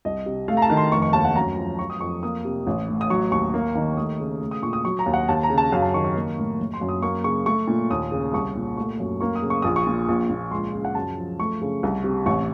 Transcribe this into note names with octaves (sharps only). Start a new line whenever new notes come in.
C2 D#5
C3
A3 F5
A#5
A5
D#3
C6
F1 C#6
C#6
D#2 A5
F#5
F#2 A#5
F3
F#3 C#6
D#6
F2 C#6
A#3 D#6
C3
A1
A2
D#6
F#3 C#6
D#2 C#6
A#3
D#3
A3 D#6
C#3
A3
D#6
A#2 C#6
D#6
F#3 C#6
A#5
D#2
F#5
D#2 A5
A#5
C#3
A5
F#2 F5
A5
D#3 C#6
C#6
A#3
A2
F#1
C6
F#2
D#6
A#3 C#6
C#3 C#6
A3 C#6
A#2
D#2 D#6
C#3
C2 C#6
A#2
A3 C#6
F#2
A#3 C#6
D#6
C#3
C#6
A#1 D#6
C#6
A#2
A#1
A#2
C#2 C6
C#3
F#5
F#2 A5
F3
A3 C#6
C#3
C2
C3
A1 C#6